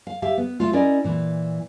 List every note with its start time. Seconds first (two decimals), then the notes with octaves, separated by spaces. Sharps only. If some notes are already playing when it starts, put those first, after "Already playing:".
0.07 F5
0.22 G4 E5 F5
0.38 B3
0.60 A3 F4
0.73 C#4 E4 A#4 D5 D#5
1.04 A#2 E3